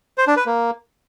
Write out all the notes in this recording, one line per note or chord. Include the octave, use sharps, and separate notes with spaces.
C5
D4
B4
A#3